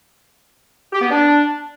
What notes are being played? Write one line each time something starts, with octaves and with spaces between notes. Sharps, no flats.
G4
B3
D4